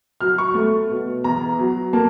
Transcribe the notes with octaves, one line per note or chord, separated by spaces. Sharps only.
F#3 F6
C#6
A3
B2
E2 A#5
F#3
A#3 A5